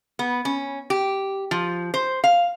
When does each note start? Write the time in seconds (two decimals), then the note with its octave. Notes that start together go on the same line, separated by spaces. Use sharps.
0.19 B3
0.45 C#4
0.90 G4
1.51 F3
1.94 C5
2.24 F5